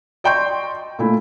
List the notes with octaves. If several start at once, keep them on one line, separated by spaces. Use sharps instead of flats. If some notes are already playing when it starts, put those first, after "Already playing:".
D5 D#5 G5 C6 C#6 G6
A#2 A3 E4